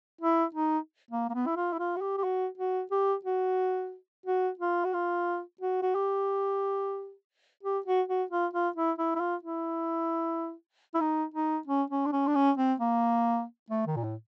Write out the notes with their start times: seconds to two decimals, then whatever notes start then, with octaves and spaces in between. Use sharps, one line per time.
0.21 E4
0.55 D#4
1.11 A#3
1.30 A#3
1.34 B3
1.47 E4
1.56 F4
1.73 E4
1.79 F4
1.96 F#4
2.01 G4
2.17 G4
2.24 F#4
2.58 F#4
2.91 G4
3.25 F#4
4.26 F#4
4.59 F4
4.84 F#4
4.93 F4
5.61 F#4
5.82 F#4
5.95 G4
7.63 G4
7.86 F#4
8.08 F#4
8.31 F4
8.53 F4
8.76 E4
8.98 E4
9.15 E4
9.20 F4
9.43 E4
10.94 E4
11.01 D#4
11.34 D#4
11.67 C#4
11.90 C#4
12.06 D4
12.12 C#4
12.27 D4
12.35 C#4
12.58 C4
12.80 A#3
13.70 A3
13.87 D#3
13.96 A#2
14.03 A2